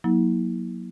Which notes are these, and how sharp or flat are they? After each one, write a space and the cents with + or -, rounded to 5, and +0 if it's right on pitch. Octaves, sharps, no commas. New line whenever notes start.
F#3 -20 A#3 +30 E4 -40